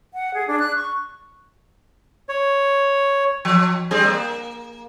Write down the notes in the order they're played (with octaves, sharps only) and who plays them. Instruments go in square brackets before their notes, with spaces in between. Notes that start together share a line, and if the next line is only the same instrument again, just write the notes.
[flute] F#5
G#4
D4
F#6
C#6
[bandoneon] C#5
[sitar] F3
G3 C4 G#4
A#3